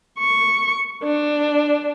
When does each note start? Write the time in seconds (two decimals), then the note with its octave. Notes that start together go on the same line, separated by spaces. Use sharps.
0.20 C#6
1.03 D4